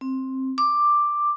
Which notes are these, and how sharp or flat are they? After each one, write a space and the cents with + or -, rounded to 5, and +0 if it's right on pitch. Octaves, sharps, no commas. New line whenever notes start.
C4 +10
D6 +5